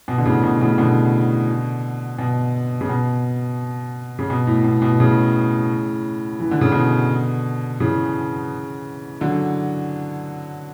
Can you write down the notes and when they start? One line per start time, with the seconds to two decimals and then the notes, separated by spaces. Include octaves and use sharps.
0.08 B2
0.18 D3
0.26 A2 C#3
0.43 B2
0.61 A2 C#3
0.78 B2 D3
2.19 B2
2.81 C#3
2.89 B2
4.19 C#3
4.30 B2
4.47 A2
4.64 B2
4.82 B2
5.00 A2 C#3
6.40 E3
6.51 D3
6.61 C#3
6.72 B2 D3
7.80 C#3 E3
9.21 D3 F#3